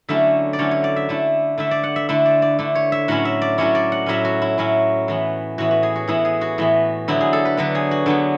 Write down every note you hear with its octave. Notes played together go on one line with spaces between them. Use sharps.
D3 F#3 A3 C#4 E4 E5
D5
D3 F#3 A3 C#4 E4 C#5
C#5
D5
E5
D3 A3 E4
D3 A3 E4 E5
D5
F#5
E5
D3 A3 E4 E5
D5
D5
D3 A3 E4
C#5
E5
A2 F#3 C#4 E4 F#5
E5
D5
A2 F#3 C#4 E4 C#5
D5
F#5
A2 F#3 C#4 E4 E5
F#4
E4
A2 F#3 C#4 E4
A2 E3 B3
A2 E3 B3 F#4
F#4
G#4
F#4
A2 E3 B3 E4
G#4
F#4
A2 E3 B3
D3 F#3 B3 E4
G#4
A4
B4
D3 F#3 B3 B4
G#4
F#4
D3 F#3 B3